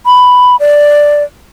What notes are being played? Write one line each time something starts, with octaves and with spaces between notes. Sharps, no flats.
B5
D5